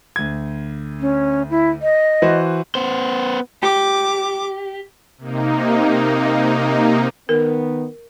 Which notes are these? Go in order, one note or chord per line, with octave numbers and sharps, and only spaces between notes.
D2 G#6
C#4
E4
D#5
E3 F#4 C5
B3 C5
G4 D6
C3 A#3 D#4
D#3 B3 A#4